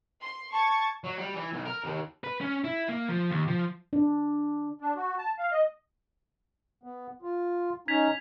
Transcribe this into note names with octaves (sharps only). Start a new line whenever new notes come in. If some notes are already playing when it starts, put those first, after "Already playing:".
C6
A5 C#6 G#6 A6
F#3
G3
E3
B1
A#4
D#2
B4
C#4
E4
A#3
F3
D#2
F3
D4
D4
F#4
A5
F5
D#5
B3
F4
C#4 D#4 G#6 B6 F7